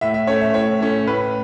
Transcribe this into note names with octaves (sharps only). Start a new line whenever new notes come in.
A2 E5
E5
A3 C#4 C#5
E5
A2 C#5
A3 C#4
A2 B4